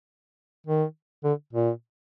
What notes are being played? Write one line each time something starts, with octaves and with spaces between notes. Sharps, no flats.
D#3
D3
A#2